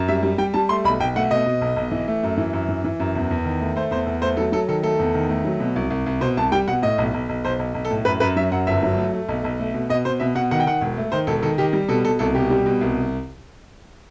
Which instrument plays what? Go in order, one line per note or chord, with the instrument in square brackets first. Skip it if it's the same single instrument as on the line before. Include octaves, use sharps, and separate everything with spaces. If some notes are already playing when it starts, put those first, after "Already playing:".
Already playing: [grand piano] F#2
G3 E5
G3
G3 G5
G3 A5
A3 C6
B1 B5
B1 G5
A3 F#5
B2 D#5
B2
B1
B1
E3
A3
F#2
E3
F#2
E3
E3
F#2
E2
E2
D#3
A3
A3 C5
E2 C5
E2
A3 C5
F#3 A4
F#3 A4
D#3 A4
A3 A4
E2
D#3
A3
F#3
B2
C2
C2
C2
B2 C5
C2 A5
G3 G5
B2 F#5
A2 D#5
B1
B1
B1
B1 C5
B1
B1
A4
A2
F#2 B4
F#2 B4
F#3 E5
F#2 F#5
G1 E5
F#3
A3
A3
B1
B1
A3
B2
B2 D#5
B2 C5
B2 E5
B2 F#5
D#3 F#5
G5
D#3 F#5
E1
A3
D#3 C5
E1 A4
D#3 A4
D#3 G4
G3
B2 A4
B2 A4
C2 A4
B2 G4
G3
B2
C2